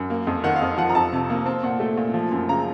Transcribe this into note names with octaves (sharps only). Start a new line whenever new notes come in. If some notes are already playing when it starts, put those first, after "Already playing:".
Already playing: F#2
A#3
F2
D#3 F#5
F5
F2
F3 F#5
A#5
F2 A5
C3
A#3
C4 A5
A#2 F#5
A3
A#2
F3
F#2
C#3 A#5